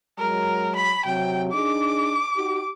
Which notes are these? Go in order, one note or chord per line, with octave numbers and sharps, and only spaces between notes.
F#3 G#3 A#4
B5
C3 F#3 G5
D4 D#4 G#4 D6
D#4 F#4 G4